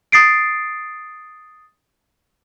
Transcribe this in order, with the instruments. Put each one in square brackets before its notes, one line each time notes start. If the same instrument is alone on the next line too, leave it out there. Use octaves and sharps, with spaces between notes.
[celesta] D#6 A6 C7 D7